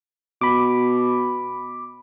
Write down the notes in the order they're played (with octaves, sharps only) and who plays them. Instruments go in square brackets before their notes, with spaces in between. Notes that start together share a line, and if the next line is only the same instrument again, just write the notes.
[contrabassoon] B2 [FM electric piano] B5 D6